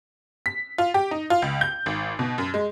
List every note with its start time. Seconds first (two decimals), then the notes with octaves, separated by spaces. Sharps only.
0.46 B6
0.78 F4
0.94 G4
1.11 D#4
1.30 F4
1.42 C#2
1.61 G6
1.86 G#1
2.19 B2
2.38 F#2
2.54 G#3